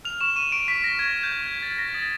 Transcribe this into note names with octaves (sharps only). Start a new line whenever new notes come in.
F6 F7
C#6 E7
C#6 D#7
C#6 D7
C#6 B6
F6 A#6
C#6 G#6
F6
G6
C#6
F6 G#6
F6 A6
C#6 A#6
D#6 A6